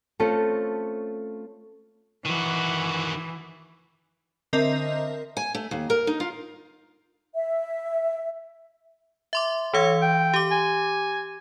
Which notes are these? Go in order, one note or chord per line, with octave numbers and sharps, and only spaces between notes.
A3 C4 C#4 F4 A4
D#3 E3 F#4
D3 C4 A#4 D#5 E5
G#5
A3
D#2
A#4
D#4
F4
E5
E5 C6 D6
E3 C#5 F5 E6
G5
G4 D6
G#5